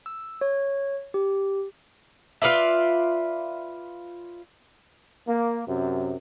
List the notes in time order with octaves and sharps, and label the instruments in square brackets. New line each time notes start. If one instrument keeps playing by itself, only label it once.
[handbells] E6
C#5
G4
[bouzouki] F4 B4 D5 E5
[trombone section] A#3
F#2 C3